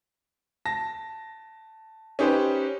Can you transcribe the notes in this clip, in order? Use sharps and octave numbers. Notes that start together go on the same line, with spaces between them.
A5 A#6
C#4 D#4 G4 B4 C5